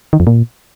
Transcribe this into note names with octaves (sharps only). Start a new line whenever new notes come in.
D#3
F2
A#2